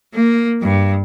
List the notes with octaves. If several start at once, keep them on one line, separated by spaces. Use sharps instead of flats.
A#3
G2